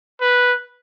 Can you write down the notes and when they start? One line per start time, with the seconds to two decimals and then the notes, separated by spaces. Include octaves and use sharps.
0.21 B4